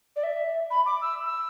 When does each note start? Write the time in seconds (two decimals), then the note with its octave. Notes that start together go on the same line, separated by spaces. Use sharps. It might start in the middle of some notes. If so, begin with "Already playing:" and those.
0.16 D5
0.23 E5
0.70 B5
0.86 D6
1.02 E6
1.26 E6